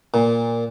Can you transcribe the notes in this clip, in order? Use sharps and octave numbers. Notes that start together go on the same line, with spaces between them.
A#2